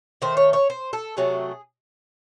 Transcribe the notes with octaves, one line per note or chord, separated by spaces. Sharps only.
D#3 A3 C5
C#5
C#5
C5
A4
C3 F#3 A3 G#4